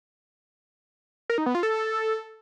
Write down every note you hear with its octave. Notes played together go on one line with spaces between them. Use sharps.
A#4
D#4
B3
F4
A4